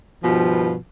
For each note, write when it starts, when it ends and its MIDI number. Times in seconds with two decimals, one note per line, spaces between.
0.24 0.76 43
0.24 0.76 47
0.24 0.76 51
0.24 0.76 53